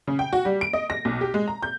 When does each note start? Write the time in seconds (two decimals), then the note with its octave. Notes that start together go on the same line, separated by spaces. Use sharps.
0.07 C#3
0.19 G5
0.33 F#4
0.45 G3
0.61 D7
0.73 D#5
0.90 A#6
1.05 B1
1.21 G4
1.34 G#3
1.48 A#5
1.63 G6